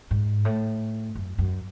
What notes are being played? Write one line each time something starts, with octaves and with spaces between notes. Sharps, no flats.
G#2
A2
F#2
F#2